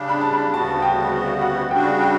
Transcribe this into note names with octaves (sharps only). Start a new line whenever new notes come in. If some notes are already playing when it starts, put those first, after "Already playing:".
Already playing: C#3 G3 D4
B5
A5
B5
D2 C#3 G3 B3 F#4 A5
G5
F#5
C#3 G3 D4 F#4 G5
G5